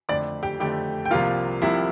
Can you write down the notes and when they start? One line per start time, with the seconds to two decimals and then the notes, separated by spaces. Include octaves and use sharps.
0.09 F2 D3 A3 D5 D6
0.43 G4 G5
0.60 F2 D3 A3 G4 G5
1.05 G5
1.11 C2 C3 F3 A#3 F4 F5
1.62 C2 C3 F3 A#3 E4 E5